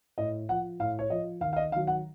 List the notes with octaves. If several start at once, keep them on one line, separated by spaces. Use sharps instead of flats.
A2 D#5
F3 F#5
A2 F5
C#5
F3 D#5
D#2 F5
F5
D#5
D#3 F#3 F5
F#5